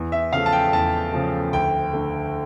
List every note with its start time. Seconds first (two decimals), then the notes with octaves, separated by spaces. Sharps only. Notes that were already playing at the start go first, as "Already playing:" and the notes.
Already playing: E2
0.12 E5
0.32 C#3 F3 A3 F5
0.46 A5
0.53 G5
0.72 E2 A5
1.12 C#3 F3 A3
1.53 D2 G5
1.93 D3 A3